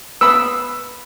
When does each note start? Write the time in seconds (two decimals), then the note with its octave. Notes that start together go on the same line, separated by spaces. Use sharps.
0.21 B3 B5 D#6 E6